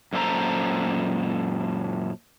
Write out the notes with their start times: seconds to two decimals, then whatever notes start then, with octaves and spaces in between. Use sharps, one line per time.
0.13 F#2 A#2 A4 C5 A#5